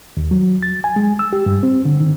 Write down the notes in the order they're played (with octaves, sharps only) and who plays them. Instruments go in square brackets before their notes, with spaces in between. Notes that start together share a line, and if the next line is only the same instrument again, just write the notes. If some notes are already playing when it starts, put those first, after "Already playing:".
[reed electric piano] D#2
F#3
A6
G#5
G#3
E6
G4
G2
C4
D3
D#3